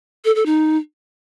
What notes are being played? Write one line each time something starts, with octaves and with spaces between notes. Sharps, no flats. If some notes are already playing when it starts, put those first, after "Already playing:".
A4
A4
D#4